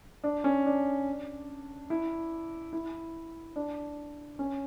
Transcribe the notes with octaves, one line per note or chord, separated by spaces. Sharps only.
D4
C#4
D4
E4
E4
D4
C#4